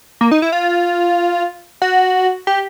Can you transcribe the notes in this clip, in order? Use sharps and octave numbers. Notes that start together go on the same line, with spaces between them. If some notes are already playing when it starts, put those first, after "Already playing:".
A#3
D#4
E4
F4
F#4
G4